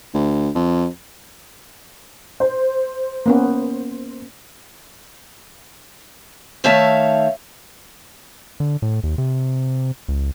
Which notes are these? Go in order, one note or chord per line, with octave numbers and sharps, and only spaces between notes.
D2
F2
C5
A#3 B3 C#4
D#3 A3 C#5 E5 F5 A5
D3
A2
D#2
C3
C#2